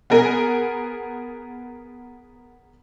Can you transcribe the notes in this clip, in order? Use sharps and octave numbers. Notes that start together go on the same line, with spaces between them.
B3 G#4 A#4